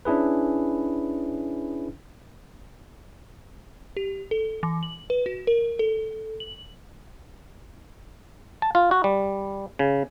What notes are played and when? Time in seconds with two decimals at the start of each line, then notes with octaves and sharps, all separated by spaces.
0.05 C#4 D4 E4 G#4 B4
3.97 G4
4.31 A4
4.63 E3
4.83 F#7
5.10 B4
5.26 F#4
5.47 A#4
5.79 A4
6.40 F#7
8.62 A5
8.75 F4
8.91 F#4
9.04 G3
9.79 C#3